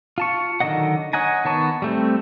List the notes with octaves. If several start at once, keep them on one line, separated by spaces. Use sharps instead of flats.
F4 A5 C#6
D3 D#3 F#3 D#5 F#5
C#5 D#5 F#5 G#5 A#5
D#3 B3 A5 C#6
G3 A3 C4